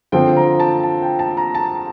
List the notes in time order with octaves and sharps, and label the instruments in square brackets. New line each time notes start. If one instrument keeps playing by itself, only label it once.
[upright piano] D3 F3 C4 G5
A#5
A5
A5
G5
A5
A#5
A5